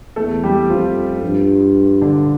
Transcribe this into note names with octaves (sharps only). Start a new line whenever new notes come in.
E2 A3 A4
G3 G4
F2 F3 F4
G2
D3 D4